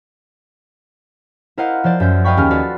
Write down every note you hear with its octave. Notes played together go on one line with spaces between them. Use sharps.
E4 A#4 C5 D#5 F5 F#5
F3 C5 D5
F#2 E5 G6
D#5 F5 G5 B5 C#6
D#2 C#4 G#4 F6
F4 F#4 A4 B4 D5